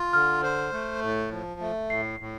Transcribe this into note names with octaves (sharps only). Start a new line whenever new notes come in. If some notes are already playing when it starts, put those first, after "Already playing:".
Already playing: F4
D3 F6
C5
A3
A2
F3
A3
A2 C7
A2